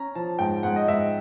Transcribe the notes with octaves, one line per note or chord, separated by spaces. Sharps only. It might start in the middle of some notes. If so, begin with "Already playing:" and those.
Already playing: C#4 A#5
F3 A5
G#2 G5
G#2 F#5
D#5
G#2 E5